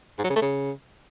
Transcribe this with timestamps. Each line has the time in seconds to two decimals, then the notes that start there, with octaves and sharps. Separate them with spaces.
0.18 G#2
0.24 F#3
0.30 C#3
0.36 A3
0.42 C#3